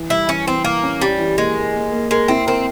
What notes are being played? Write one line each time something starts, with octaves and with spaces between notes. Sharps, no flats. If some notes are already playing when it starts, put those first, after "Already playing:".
Already playing: E3
G3 E4
E3 C#4
E3 C4
E3 A#3
C#4
G3 C#4
E3
G#3 A#3
A#3
A#3
A#3
G#3 A#4
C4 E4
C4 A#4